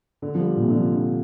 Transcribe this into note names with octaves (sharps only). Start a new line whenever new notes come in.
D3
F3
G3
A#2
C3
D3
F3
D3